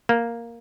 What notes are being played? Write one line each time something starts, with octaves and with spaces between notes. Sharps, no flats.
A#3